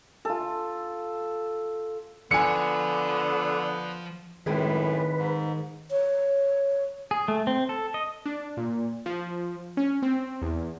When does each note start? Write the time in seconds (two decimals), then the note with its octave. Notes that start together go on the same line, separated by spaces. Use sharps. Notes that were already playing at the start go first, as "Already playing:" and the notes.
0.25 F4 A4
2.31 D3 F3 B3 G#5 C#7
4.46 F#2 A2 D#3 F3 G#3 C4 B4
5.17 G#2
5.91 C#5
7.11 G#4
7.28 A3
7.47 C4
7.69 A4
7.94 D#5
8.26 D4
8.57 A#2
9.06 F3
9.77 C#4
10.02 C4
10.42 E2